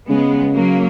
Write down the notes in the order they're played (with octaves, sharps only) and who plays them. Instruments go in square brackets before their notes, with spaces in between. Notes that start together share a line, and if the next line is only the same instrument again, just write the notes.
[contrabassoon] C#3 [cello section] G#3 B3
[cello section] F#3 A#3